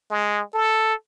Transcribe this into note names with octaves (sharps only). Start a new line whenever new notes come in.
G#3
A4